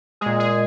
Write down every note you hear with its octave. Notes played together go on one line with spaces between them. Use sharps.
A#2 G#3 G#4
G#4